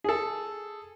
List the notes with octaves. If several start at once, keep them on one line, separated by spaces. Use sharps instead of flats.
G#4 A4